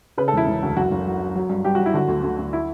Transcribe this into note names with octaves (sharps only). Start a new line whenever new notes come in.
C#3 B4
A4
E1 E4
E1
D2
F#1 F#4
F#1
F#3
F#3
F#3
G2
G2 G4
F#3 F#4
E4
D3 F#4
D2
D2
D2
E4